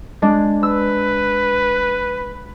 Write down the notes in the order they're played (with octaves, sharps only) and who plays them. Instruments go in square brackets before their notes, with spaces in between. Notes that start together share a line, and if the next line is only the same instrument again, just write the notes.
[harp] G#3 D4
[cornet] B4 [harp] E6